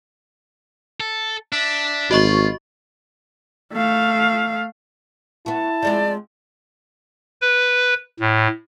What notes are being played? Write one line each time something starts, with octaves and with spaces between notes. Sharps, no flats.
A4
D4 E5
G#1 F4 F#4 D#5 C#6
A3 F5
B3 E4 F#4 A5
F3 G#3 C4 D5
B4
A2